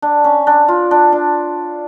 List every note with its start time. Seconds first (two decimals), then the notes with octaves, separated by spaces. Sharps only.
0.02 D4
0.24 C#4
0.47 D4
0.68 F4
0.91 D4
1.12 D4